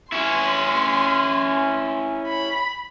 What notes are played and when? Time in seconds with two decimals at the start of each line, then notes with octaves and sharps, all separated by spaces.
0.12 C#4 E4 C6
2.27 B5